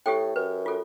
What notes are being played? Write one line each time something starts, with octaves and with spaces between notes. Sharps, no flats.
A2 G4 A4 G5
F#2 B4
F4 A4